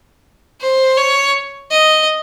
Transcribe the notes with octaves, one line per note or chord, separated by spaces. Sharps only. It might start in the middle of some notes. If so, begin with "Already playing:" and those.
C5
C#5
D#5